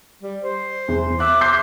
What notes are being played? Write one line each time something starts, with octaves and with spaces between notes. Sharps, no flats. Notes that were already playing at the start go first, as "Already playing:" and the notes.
G3
C5
E2
E5 D6 F#6
C6 G6 C7